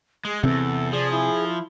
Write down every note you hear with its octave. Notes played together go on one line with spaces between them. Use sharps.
G#3 G#4
E2 G2 C3 C4 A4
F3 G#4 D5
E4